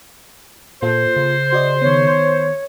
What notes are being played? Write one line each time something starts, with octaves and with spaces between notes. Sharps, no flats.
A#2 A#3 F4 A4 C5
C#3
F#4 D5 D#5
D#3 B3 C#5